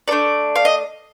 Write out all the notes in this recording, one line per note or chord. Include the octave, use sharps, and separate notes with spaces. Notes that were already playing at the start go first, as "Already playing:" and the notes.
A3 D4 A4 D5
F5
D#5